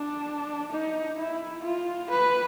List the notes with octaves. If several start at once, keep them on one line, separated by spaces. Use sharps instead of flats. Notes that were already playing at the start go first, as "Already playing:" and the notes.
Already playing: D4
D#4
E4
F4
B4